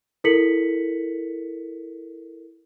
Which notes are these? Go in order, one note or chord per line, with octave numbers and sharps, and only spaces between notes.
E4 A4 A#4 B6 C#7 F#7